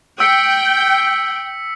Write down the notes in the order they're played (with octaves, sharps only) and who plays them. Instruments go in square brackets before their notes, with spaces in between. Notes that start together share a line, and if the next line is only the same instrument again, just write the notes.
[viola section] G5 [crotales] E6 B6 C#7